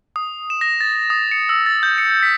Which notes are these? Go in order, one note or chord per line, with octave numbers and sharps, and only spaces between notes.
D#6
E7
A#6
A6
D#6
C#7
E6
A6
G6
C#7
B6